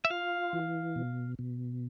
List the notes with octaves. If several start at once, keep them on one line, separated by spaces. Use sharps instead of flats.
E5
F4 F5
E3
B2
B2